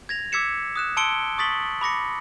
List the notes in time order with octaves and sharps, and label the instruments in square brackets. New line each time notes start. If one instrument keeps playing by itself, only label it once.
[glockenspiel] G#6 A#6 F7
D6 E6 G#6 B6 C#7 E7
D#6 F#6 E7
A5 C6 E6 C#7 D7 G7
C#6 D#6 A6 B6 F#7
B5 D6 A#6 C#7